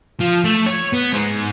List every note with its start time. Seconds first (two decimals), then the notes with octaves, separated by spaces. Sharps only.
0.20 F3
0.44 A3
0.66 C#5
0.93 B3
1.13 G#2 C5